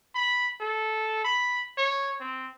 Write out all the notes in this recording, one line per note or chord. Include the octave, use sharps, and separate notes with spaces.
B5
A4
B5
C#5
C4